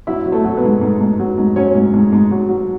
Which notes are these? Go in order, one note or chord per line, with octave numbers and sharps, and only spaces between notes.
F#3 E4 E5
F#3
A3 A4
F#3
B3 B4
G#2
G#2
G#2
F#3
G#2
F#3 C#4 C#5
G#2
G#2
G#2
F#3
F#3